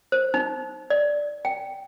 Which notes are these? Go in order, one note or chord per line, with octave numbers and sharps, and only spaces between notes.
C5
D#4
D5
G5